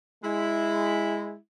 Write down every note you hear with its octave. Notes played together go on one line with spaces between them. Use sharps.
G#3 E4